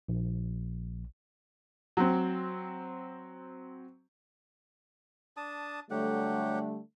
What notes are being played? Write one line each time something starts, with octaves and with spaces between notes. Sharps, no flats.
A#1
F#3 C4
D4 A5 D#6
D3 F#3 G3 A3 G4 F#5